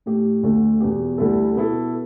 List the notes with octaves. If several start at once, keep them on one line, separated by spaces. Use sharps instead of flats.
A2 A3 G4
D2 D3 A3
E2 B2 B3 G4
D2 D3 G3 E4 A4
B2 B3 E4 A4